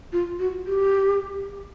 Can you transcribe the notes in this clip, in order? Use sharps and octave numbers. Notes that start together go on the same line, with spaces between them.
F4
F#4
G4